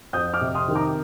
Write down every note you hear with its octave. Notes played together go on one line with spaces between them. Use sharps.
F2 D#6 G6
D6 F6
C3
C6 D#6
D#3
A#5 D6